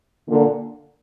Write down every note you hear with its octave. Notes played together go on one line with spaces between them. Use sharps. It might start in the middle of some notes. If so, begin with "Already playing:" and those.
A#2 D3